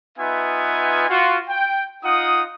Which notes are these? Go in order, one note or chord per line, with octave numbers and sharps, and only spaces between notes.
B3 D#4 F4 B4 E5 G#5
F4 F#4
G5
D#4 F4 F#5 D#6